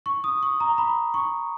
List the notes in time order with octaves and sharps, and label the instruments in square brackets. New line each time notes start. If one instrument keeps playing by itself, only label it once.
[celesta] C#6
D#6
C#6
A#5
B5
C#6